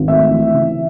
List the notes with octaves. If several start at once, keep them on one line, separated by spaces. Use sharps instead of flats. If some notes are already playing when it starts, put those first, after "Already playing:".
Already playing: G#1
A3 E5
E3
C#3